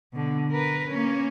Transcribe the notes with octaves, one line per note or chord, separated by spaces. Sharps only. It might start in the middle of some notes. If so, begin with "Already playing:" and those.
B2 D3
A#4 B4
A#3 C#4